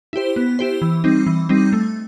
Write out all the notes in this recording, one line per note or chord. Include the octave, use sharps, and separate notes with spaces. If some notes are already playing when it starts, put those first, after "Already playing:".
E4 G4 C5
B3
E4 G4 C5
E3
G3 C4 D#4
E3
G3 C4 D#4
A3